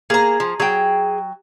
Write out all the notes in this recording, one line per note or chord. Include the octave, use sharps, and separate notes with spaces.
A#3 G#4 A#5
F3
F#3 G#4 G5